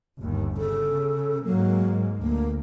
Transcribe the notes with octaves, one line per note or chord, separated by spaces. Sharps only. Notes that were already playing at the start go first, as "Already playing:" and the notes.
G1 D#2
C#3 A4
G#2 F#3 A#3
D2 A#3